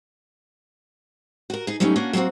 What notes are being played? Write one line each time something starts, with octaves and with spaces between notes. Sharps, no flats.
F#4 A#4
D#4 G#4
F#3 G3 A3 C#4 D#4
A#3 C#4 D4 F#4
F#3 G3 A#3 C4 F#4